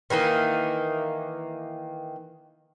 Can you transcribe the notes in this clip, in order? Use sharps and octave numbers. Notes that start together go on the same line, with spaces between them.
D#3 E3 A#3 D#4